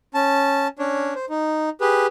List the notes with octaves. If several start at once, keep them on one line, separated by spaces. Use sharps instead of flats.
C#4 A5
C#4 D4 C#5
C5
D#4
G4 G#4 B4